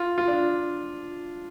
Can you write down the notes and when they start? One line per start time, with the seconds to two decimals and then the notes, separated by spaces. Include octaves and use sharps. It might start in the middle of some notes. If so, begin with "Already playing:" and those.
Already playing: F4
0.18 F4
0.28 D4